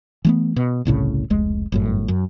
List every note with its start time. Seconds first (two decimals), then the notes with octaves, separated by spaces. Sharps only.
0.25 E3 A3 B3
0.56 B2
0.85 G1 C2 A2 C#3
1.30 F1 C#2 G#3
1.72 G1 F#2 A2
2.08 F#2